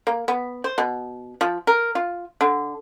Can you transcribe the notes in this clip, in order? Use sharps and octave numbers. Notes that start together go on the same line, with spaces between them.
A#3
B3
C5
B2
F3
A#4
F4
D3